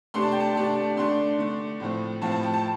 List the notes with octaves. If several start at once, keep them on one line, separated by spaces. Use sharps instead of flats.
C3 A3 D4 C6
A5
G5
A5
C3 A3 D4
D3 A3 D4 C6
D3 A3 D4
A2 F3 A3 C4
A2 F3 A3 C4 A5
A5
G5
A5